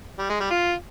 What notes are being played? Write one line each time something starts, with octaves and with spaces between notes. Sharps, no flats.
G3
G#3
G3
F4